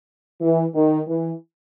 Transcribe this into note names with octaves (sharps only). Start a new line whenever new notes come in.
E3
D#3
E3